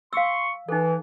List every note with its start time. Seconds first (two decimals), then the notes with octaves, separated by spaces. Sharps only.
0.13 F5 C6 C#6 E6
0.69 E3 D#4 A4